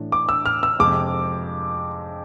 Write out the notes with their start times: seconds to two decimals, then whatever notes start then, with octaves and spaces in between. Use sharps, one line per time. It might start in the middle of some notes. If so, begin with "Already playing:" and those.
Already playing: A2 E3 A3 D4
0.12 D6
0.29 E6
0.46 F6
0.63 E6
0.79 F2 C3 G#3 D6